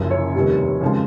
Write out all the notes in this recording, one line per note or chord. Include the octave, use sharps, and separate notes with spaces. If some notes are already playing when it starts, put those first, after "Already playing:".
Already playing: F#1 F#2 C#3 F3
C#5
F1 D#2 D#3 G3
F2 C#3 F3 G#3